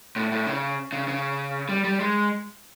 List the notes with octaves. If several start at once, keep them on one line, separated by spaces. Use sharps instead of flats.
A2
A2
C#3
C#3
C#3
G3
G3
G#3